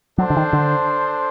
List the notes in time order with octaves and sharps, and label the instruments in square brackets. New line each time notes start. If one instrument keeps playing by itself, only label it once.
[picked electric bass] F#3 [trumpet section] D4 A4 C5
[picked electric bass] D3
D#3
D3